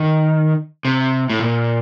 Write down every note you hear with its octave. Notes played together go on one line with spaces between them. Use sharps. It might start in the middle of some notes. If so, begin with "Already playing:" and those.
Already playing: D#3
C3
A2
A#2